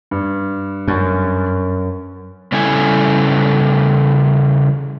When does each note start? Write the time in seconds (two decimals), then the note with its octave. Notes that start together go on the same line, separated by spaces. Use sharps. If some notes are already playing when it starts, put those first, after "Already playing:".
0.11 G2
0.88 F#2
2.52 C#3 G3 C#4 E4 A4 G#5